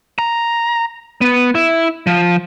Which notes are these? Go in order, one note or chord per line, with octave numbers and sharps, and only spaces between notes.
A#5
B3
E4
F3